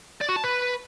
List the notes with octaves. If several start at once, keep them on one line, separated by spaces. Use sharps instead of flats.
D5
F#4
A5
B4